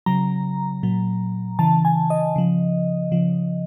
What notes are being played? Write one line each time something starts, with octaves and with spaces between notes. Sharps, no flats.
C#3 F#3 A#5
A#2 F#3
C#3 E3 A5
G#5
D#5
C#3 F3
C#3 F3